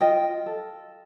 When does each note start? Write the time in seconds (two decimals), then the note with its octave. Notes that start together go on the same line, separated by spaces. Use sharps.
0.01 F4 D#5 G5
0.46 A4